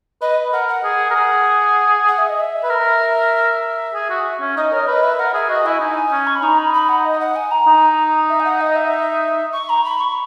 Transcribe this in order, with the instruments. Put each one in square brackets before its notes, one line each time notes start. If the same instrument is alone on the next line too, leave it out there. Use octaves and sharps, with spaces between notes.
[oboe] B4 [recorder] D#5
[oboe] A#4 [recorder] F#5
[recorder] F#5
[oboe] G#4
A#4
G#4
[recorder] F#5
E5
D#5
E5
[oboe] B4
A#4
G#4
F#4
C#4
[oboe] D#4 [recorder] D#5
[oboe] A#4 [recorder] C#5
[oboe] B4 [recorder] D#5
[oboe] B4 [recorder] E5
[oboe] A#4 [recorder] F#5
[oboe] G#4 [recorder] E5
[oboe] F#4 [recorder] D#5
[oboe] E4 [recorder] G#5
[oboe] D#4
C#4
[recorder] C#6
B5
[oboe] D#4 [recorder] A#5
[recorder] B5
B5
F#5
D#5
F#5
G#5
A#5
[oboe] D#4
[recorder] E5
G#5
F#5
D#5
E5
C#6
A#5
B5
C#6